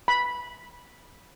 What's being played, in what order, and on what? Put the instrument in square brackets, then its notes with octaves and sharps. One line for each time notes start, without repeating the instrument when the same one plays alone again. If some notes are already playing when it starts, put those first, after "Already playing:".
[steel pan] B5